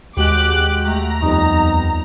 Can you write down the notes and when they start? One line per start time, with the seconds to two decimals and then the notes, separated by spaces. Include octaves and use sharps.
0.17 D#2 G#3 F#4 G4 D6 F#6
0.87 A3 A#5
1.22 F2 G3 B3 D#4